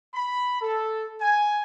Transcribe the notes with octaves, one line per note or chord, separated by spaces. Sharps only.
B5
A4
G#5